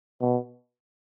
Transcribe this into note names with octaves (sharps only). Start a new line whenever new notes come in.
B2